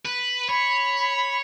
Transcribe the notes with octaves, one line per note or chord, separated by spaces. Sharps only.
B4
C#5 B5